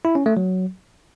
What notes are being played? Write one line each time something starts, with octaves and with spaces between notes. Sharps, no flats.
E4
C#4
A3
F#3